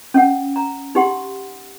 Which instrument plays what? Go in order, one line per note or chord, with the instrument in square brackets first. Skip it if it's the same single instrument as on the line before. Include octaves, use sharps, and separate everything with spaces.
[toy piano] C#4 F5 F#5
A#5
D#4 G4 F#5 C6